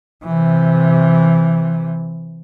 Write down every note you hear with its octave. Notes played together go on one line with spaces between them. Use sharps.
C3 E3